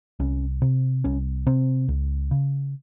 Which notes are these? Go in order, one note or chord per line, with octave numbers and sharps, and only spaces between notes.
C2 C#4
C3
C2 C#4
C3 C4
C#2
C#3